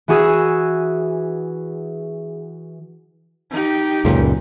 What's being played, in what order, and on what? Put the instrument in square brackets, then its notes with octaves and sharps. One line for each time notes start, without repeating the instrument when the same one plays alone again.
[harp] E3 F#4 G#4 D#6 E6
[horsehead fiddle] D#4 G4
[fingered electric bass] C#2 F#2 A#2